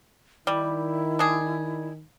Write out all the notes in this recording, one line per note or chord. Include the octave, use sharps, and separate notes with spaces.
D#3 G3 E4
D4 G#4